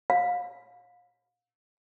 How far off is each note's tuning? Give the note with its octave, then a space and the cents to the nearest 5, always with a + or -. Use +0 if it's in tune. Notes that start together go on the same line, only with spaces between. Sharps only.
F5 +35